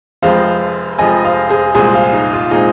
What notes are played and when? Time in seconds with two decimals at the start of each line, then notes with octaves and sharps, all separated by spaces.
0.22 F1 F2 F3 G#3 C4 C5 F5
0.98 F1 F2 F3 G#3 C4 D#5 G#5
1.24 C5 F5
1.49 G#4 C5
1.74 C2 A#2 G#3 C4 G#4 C5
1.94 C5 F5
2.13 D#4
2.33 F4
2.51 A#2 G#3 C4 D#4 G#4